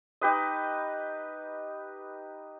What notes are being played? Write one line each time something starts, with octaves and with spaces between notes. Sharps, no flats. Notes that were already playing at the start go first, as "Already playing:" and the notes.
D#4 G4 B4 D#5